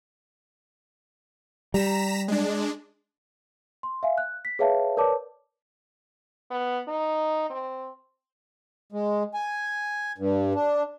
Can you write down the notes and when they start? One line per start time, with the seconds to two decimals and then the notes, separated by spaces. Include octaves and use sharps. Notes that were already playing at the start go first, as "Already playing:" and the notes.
1.74 G3 A#5 B6 E7
2.28 G#3 D4
3.83 C6
4.03 E5 F5 G#5
4.18 F#6
4.45 B6
4.59 G#4 B4 C#5 E5 F5 A5
4.97 A#4 B4 C#5 D5 A5 D6
6.51 B3
6.88 D#4
7.50 C4
8.92 G#3
9.34 G#5
10.18 G2
10.55 D4